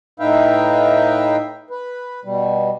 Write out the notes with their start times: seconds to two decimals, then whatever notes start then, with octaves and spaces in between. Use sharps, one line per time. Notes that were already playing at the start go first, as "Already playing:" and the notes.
0.20 A2 D#4 B4 E5 F5 G5
1.70 B4
2.25 B2 G3